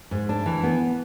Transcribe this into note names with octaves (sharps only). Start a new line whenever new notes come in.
G#2
D4
E3
B3